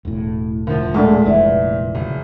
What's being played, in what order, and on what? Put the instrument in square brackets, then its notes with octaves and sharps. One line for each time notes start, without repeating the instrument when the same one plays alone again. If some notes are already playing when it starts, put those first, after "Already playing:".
[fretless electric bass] E1 A2
[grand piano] D2 F3 [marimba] A#4
[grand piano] A#2 [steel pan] G#3 A3 D4 [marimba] F#5
[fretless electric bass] F1 A#1 E3 [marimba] B4 D5 E5
[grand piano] F#1